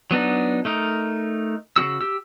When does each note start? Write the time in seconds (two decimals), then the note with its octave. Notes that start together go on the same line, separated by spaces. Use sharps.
0.11 F#3 B3 D4 D#4
0.65 A3 D#4 A#4
1.76 C#3 C#4 F#4 E6
2.01 G4 E6